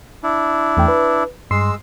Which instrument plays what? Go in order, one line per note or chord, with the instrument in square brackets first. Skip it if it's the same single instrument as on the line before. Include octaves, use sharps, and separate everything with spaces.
[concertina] D4 E4
[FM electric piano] E2 A3 G5
B4
[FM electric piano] G2 C6 C7 [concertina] G#3 E6